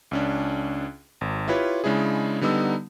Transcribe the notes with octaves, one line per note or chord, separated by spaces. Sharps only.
C#2 C#4 D4
G#1
E4 F4 G4 B4 C#5
C#3 G#3 D4 E4 G#4
D3 G3 B3 D#4 E6